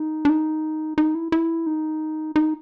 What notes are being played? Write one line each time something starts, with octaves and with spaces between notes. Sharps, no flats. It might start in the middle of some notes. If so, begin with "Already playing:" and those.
Already playing: D#4
D4
D#4
D#4
E4
E4
D#4
D#4